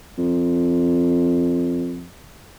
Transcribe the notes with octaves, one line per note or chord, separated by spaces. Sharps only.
F2